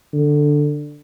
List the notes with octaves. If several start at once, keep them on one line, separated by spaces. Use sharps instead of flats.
D3